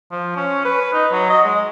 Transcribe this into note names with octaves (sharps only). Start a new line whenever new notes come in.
F3
C#4
B4
D#4
F#3
D#5
G#3